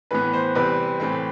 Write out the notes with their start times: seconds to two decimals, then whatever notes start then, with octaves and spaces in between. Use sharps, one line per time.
0.11 A2 E3 B3 B4
0.33 C5
0.55 E2 C3 G3 C4 B4
1.00 A2 E3 A3 C4